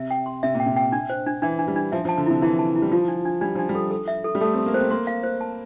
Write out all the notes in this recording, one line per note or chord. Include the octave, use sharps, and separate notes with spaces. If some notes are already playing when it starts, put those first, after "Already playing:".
Already playing: C3 E5
G5
C6
C3 E5
A#2
G5
C3
G5
D4
C5
D4
E3 D4
D4
G3
D4
F3 E5
F3
A5
D3
C3 E4
E3 E4
A5
E4
G3
F3 F4
D4
D4
G3 D4
F3 D4
G3
A4
A4
E5
A4
G3
A3 A4
C4
A4
A#3
C4 C5
A#3 C6
F5
C5
A5